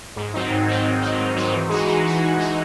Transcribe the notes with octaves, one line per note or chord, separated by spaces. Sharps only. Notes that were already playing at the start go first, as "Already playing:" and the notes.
G#2
D#3 F#3 C4 D#4
G#2
D#3 F#3 C4 D#4
G#2
D#3 F#3 C4 D#4
G#2
D#3 F#3 C4 D#4
E3
G#3 D#4 F#4
E3
G#3 D#4 F#4
E3
G#3 D#4 F#4